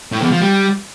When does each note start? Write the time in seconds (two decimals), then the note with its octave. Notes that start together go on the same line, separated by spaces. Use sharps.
0.12 A2
0.22 E2
0.32 F3
0.42 G3